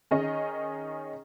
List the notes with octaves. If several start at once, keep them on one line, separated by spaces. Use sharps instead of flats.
D#3 C#4 G#4 D#5